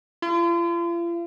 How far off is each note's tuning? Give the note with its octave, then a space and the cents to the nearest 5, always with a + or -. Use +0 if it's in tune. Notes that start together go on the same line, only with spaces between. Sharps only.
F4 -40